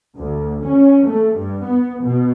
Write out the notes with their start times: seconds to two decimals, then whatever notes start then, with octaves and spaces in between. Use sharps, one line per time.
0.17 D2
0.64 C#4
1.06 A3
1.34 G2
1.64 B3
2.03 B2